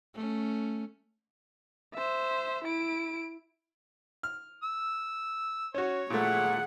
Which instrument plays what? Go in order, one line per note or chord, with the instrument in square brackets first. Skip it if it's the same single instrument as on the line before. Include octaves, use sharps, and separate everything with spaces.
[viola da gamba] A3 C#4
[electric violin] C5 E5
E4 D7
[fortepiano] F6
[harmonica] E6
[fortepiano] C#4 F#4 [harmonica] C#5
[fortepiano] A#2 A3 [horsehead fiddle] G#4 F#5